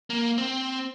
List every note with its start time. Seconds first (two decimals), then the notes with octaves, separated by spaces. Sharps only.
0.10 A#3
0.38 C4